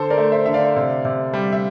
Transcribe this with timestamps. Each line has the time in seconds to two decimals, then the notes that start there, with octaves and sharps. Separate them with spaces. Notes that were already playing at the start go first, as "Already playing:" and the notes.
Already playing: D3 A4 C5
0.10 A#4 D5
0.17 A3
0.32 C5 E5
0.46 D3 E5
0.54 D5 F5
0.76 C3
1.05 C3
1.34 G3
1.52 E5